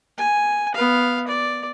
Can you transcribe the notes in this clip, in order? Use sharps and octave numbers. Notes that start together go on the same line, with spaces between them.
G#5
B3 F5
D5